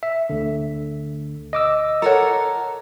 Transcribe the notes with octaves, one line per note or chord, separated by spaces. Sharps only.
E5
D2 D3
D#5 D6 E6
A4 A#4 C#5 F#5 A#5